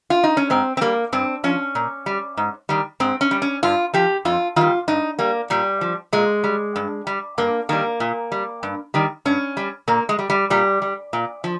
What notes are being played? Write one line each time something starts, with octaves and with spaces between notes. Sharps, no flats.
F4
D#4
C#4
G#2 C4
C4
G3 A#3
G2 C4
F3 C#4
A#2
G3
G#2
D#3 G3
G#2 C4
C#4
G3
C#4
G2 F4
F3 G4
F2 F4
D#3 G3 F4
G2 D#4
G3 A#3
A#2 G3
F3
A#2 G#3
G3
G2
G3
G2 A#3
D#3 G3 A#3
A#2
G3
G2
D#3 G3
G2 C#4
G3
A#2 A#3
G#3
G3
G3
A#2 G3
G3
A#2
F3